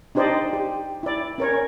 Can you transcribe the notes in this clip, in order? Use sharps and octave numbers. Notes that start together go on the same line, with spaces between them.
D4 D#4 G4 C5 D5 D#5
G4
E4 D5
C#4 A#4 C#5